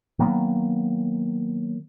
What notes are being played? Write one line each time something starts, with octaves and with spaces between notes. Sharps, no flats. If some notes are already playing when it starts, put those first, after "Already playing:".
D#3 F#3 A#3 B3